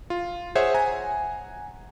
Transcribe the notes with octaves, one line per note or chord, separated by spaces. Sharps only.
F4
G#4 C5 C#5 E5 F#5
F#5 G#5 A#5